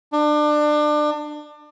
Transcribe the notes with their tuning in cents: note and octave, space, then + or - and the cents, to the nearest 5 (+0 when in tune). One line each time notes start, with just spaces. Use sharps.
D4 +30